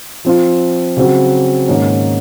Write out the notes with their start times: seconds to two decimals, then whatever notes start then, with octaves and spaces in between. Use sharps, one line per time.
0.25 F3 C4 F4
0.97 C#3 F#3 C4 F#4
1.68 G#2 D#3 A#3 C#4